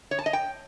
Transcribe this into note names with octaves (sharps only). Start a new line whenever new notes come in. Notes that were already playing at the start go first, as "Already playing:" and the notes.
C#5
A5
D#5
G5